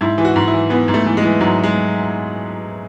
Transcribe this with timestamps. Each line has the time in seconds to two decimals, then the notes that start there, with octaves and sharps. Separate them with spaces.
0.01 G#2 E4
0.18 E3
0.25 F#4
0.36 G#2
0.48 E4
0.54 E3
0.70 E3 B3
0.88 G#2
0.94 A3
1.06 E3
1.17 G#3
1.22 E3
1.41 G#2 F#3
1.63 G#3